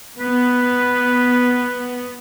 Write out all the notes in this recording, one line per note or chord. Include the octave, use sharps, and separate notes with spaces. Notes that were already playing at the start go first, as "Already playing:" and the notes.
B3 B4